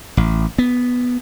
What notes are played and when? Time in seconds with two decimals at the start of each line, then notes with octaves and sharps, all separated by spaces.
0.17 A1
0.58 B3